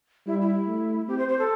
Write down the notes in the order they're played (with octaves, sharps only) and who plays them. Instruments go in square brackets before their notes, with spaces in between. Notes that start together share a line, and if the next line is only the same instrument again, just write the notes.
[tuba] G3 [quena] E4
[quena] E4
[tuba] A3
[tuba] C4 [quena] G4
[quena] C5
C5
A4